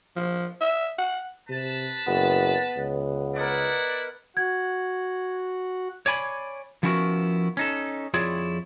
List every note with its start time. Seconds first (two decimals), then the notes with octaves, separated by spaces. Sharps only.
0.16 F3
0.61 E5
0.98 F#5
1.49 C3 B4 A5
2.06 F#1 B3
2.77 C#2
3.36 E4 A#4 B4 D5 D#5 F#5
4.37 F#4 F#5 G#6
6.06 C#5 D5 G#5 B5
6.83 F3 B3 C#4 E4 F#4 A#4
7.57 C#4 D#4 A4
8.14 F2 E4 F4 G#4 C#5 D5